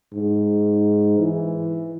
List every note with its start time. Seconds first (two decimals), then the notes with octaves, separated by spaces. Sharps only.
0.14 G#2
1.19 E3